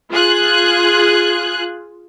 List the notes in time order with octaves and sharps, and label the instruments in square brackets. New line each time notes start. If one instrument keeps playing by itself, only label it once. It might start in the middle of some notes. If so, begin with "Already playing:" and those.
[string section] F4 G#4 F#6